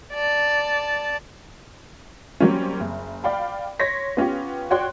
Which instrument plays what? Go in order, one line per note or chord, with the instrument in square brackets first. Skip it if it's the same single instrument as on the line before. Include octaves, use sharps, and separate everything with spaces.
[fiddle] D5 A5
[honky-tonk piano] F#3 G3 A#3 C4 C#4
F#1
D5 F5 G5 B5
C#5 C6 A#6 B6
B3 C#4 F4 G4
F#4 C#5 D5 G5 C6 F#6